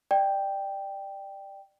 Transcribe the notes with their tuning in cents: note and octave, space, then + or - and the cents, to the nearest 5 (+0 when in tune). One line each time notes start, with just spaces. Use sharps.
D5 +20 G5 +0